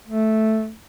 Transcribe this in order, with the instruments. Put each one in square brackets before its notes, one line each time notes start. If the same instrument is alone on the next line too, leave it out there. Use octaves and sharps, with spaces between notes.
[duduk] A3